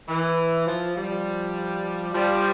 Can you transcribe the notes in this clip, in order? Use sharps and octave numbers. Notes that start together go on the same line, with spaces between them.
E3
F3
F3 G3
F3 G3